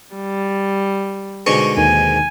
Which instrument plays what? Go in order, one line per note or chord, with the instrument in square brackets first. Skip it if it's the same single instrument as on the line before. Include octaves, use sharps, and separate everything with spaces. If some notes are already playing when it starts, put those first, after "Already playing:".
[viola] G3
[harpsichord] G#2 B2 D3 [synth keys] C#6
[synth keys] D#2 [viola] G#5